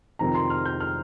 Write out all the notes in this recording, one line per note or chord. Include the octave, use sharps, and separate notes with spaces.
F1 F2 C3 D#3 C4 A#5
C6
F6
G6
F6